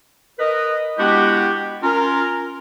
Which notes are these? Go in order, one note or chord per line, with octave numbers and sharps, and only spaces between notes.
A#4 B4 D#5
G#3 B3 D4 E4 F#4 G4
C#4 F4 A#4